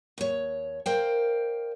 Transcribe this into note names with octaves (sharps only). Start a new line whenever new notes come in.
D#2 C#5
A#4 C5 D5 F5 G5